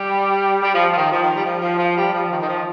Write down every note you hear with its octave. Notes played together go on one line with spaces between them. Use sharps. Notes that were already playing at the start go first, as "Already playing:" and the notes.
Already playing: G3
G3
F3
F3
D#3
F3
D#3
G3
F3
F3
F3
G3
F3
D#3
D#3
F3